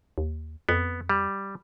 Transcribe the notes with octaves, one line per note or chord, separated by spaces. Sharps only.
D#2
F2 B3
G3